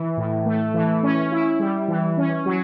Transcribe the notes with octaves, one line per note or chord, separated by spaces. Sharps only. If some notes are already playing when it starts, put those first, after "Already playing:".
Already playing: E3
A2
A3
E3
C#4
E4
G3
E3
C#4
F#3